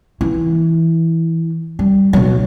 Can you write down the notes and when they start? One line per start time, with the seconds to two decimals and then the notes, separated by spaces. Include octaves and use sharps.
0.21 E3
1.79 G3
2.13 B1 F#3